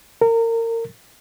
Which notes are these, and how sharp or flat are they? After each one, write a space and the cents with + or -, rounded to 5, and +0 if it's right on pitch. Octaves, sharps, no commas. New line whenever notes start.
A#4 -30